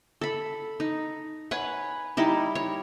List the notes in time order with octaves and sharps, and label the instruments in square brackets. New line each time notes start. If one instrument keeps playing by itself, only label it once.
[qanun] A4 B5
D#4
B4 C#5 F#5 G#5
G3 D#4 E4
C#5